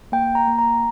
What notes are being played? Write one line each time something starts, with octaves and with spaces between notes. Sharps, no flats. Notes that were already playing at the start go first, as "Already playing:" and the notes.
A#3 G5
A#5
A#3
A#5